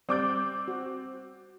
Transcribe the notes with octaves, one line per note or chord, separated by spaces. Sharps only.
G3 C4 D5 D6 G6
F#4